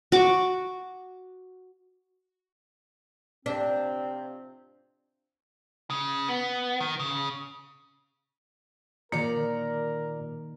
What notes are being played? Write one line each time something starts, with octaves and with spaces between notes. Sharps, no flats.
F#4 D6
C3 F3 C4 D4
C#3
B3
D#3
C#3
A#2 D#3 A#3 A#4 D5 A#5